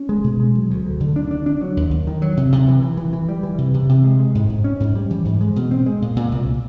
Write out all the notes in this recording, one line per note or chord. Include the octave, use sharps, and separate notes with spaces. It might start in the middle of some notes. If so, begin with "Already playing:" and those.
Already playing: C#4
G#3
B2
G#3
F#3
D2
D2
D3
D4
D4
D4
F#3
D#2
D#2
D#3
F#3
C3
C3
E3
E3
E3
E3
G3
E3
C3
C3
C3
G#3
G#3
G#2
G#2
C#4
G#2
G3
E3
G#2
G#3
B2
C4
G#3
A#2
A#2
C2